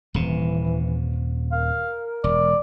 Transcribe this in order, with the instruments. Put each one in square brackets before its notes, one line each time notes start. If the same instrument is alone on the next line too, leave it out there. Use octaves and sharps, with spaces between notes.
[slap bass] D#1 C3 [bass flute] E3
[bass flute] A#4 [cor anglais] F5
[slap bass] E1 [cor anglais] D5